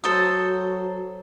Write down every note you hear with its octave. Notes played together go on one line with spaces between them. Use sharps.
F#3 F#4 A4 C5 D#6